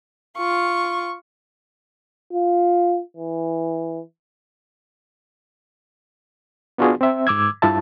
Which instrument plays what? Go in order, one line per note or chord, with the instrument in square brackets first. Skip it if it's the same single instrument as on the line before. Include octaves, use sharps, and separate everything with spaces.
[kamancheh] F4 C#6
[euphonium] F4
E3
[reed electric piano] B3 D4 F4 F#4 G#4
C4 E5
G#2 D6 E6 G#6
G2 E4 F4 E5 A5